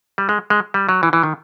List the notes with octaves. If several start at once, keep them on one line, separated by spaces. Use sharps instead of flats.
G3
G#3
G#3
G3
F#3
E3
E3
D#3